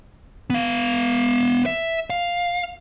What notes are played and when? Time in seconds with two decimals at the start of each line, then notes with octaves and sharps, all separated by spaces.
0.50 B3 F5
1.66 E5
2.10 F5